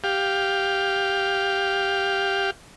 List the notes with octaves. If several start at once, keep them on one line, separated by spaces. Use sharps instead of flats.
G4 F5